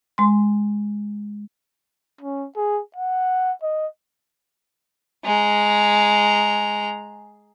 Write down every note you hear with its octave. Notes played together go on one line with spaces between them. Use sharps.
G#3 C6
C#4
G#4
F#5
D#5
G#3 A#5